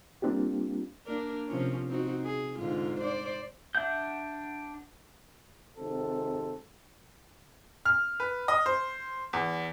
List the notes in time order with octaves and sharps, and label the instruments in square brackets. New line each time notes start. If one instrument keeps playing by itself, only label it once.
[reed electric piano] G3 A#3 C4 D4 F4 G4
[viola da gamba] A#3 D4 A#4
C3 F3 C#4
C4 D#4 F#4
G#4
G#2 D3 F4
C5 D5
[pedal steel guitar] D4 E5 F#5 G6
[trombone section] G#1 C3 C4 A4
[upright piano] F6
B4
D#5
C5
E2